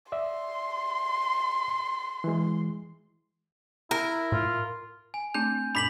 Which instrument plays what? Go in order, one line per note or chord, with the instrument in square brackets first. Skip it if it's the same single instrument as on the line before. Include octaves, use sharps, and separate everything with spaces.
[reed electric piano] D5 E5 [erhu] C6
[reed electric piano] E3 G#3
[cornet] E4 [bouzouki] A#4
[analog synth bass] A2 [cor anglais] F4
[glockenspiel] G#5
[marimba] A3 C4 D4 [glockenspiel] G6
[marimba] F#2 A#2 D4 [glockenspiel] B5 B6 F#7